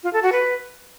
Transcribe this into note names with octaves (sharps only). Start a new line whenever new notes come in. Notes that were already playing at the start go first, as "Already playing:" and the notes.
F4
A4
F#4
B4